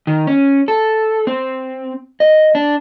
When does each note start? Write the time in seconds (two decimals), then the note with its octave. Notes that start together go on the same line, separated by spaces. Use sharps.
0.07 D#3
0.27 C#4
0.68 A4
1.27 C4
2.20 D#5
2.55 D4